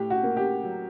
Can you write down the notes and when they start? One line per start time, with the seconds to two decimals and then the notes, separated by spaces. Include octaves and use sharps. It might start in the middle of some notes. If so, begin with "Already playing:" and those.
Already playing: A2 G4
0.10 F#4
0.23 A#3
0.37 G4
0.63 F#3